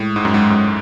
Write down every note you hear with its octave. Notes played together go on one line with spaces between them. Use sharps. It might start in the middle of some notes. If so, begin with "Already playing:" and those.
Already playing: A2 G#3
G#2
F#2
G#2
F#2